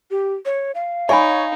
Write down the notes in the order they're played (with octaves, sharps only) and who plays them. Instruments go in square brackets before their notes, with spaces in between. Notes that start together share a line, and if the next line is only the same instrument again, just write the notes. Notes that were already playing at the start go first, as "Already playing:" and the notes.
[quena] G4
C#5
F5
[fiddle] D#4 [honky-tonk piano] C#5 [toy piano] D5 G#5 B5